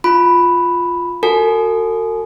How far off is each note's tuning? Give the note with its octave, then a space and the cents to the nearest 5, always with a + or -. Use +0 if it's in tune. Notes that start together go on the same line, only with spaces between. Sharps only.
F4 +0 B5 +0
F#4 +0 A4 +45 G#5 +35